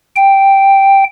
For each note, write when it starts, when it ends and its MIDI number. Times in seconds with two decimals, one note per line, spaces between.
0.16 1.04 79